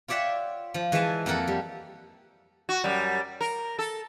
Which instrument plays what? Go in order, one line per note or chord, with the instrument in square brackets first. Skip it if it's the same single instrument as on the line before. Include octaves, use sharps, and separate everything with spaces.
[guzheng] F4 C#5 D5 E5 F#5 G5
F3
E3 G#3 C#5 E5 G#5 A5
F2 A#3 A4 A#4 F#5
G3
[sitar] F#4
F#2 G3
A#4
A4